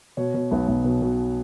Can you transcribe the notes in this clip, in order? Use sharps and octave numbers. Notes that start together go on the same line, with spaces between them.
B2 C#5
B2
B1 B3
B1
B2
B2